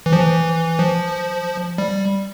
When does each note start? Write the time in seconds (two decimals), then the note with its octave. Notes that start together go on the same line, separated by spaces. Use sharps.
0.06 E3
0.13 F3
0.21 E3
0.79 F3
1.78 G3